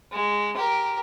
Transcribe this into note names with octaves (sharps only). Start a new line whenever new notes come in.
G#3
G4 A#4